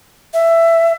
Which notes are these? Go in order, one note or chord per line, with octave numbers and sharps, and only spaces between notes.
E5